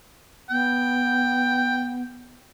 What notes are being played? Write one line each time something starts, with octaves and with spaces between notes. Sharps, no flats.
B3 G5